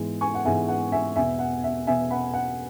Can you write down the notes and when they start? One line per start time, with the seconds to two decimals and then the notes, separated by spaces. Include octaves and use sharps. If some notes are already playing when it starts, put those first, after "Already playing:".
Already playing: G#2 E3 G#3 B3
0.21 G#5 C#6
0.34 F#5
0.44 G#2 E3 G#3 B3 E5 G#5
0.68 F#5
0.92 E5 G#5
1.16 E2 B2 B3 E5 G#5
1.39 F#5
1.64 E5
1.87 E2 B2 B3 E5 G#5
2.10 F#5 B5
2.34 F#5